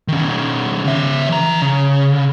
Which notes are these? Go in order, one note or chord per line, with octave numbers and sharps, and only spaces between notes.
D#3 C#4
C#3 E5
E3 A#5
C#3